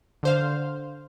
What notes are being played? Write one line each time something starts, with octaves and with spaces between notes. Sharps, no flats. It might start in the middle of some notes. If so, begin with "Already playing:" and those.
D3 C5 F5